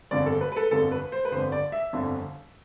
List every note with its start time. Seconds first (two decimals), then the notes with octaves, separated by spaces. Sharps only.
0.11 G1 F2 D3 D5
0.26 A4
0.41 B4
0.52 B4
0.56 A4
0.71 G1 F2 D3 A4
0.91 B4
1.12 C5
1.25 B4
1.31 G1 F2 D3 C5
1.52 D5
1.72 E5
1.93 G1 F2 D3